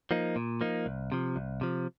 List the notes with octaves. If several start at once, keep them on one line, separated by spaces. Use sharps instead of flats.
F3 A#3 D#4
A#2
F3 A#3 D#4
C2
C3 F3
C2
C3 F3